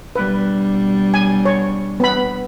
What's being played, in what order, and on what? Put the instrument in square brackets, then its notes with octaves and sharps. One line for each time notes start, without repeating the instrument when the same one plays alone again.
[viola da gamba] B2 G3 D4 [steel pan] B4
[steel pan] G#5
C#5
B3 B5